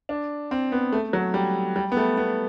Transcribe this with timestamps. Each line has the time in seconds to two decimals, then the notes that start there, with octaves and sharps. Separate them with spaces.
0.09 D4
0.51 C4
0.72 B3
0.92 A3
1.13 F#3
1.34 G3
1.76 G3
1.92 B3
1.97 A3
2.17 B3